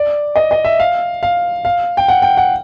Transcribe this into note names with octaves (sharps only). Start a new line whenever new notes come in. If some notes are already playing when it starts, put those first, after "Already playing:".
Already playing: D5
D#5
D#5
E5
F5
F5
F5
G5
F#5
G5
F#5